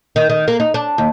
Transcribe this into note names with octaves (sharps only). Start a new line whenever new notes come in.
D#3
D#3
A#3
D#4
D4
D#2